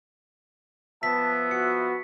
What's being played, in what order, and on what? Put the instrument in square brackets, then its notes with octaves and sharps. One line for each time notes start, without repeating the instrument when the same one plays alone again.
[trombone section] F3 B3 [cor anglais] E5 [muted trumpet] A5 [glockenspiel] B6
[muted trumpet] F#4 [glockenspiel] C#7